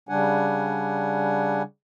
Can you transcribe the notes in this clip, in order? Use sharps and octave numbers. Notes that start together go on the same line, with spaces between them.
C#3 G3 D4 F#5 G#5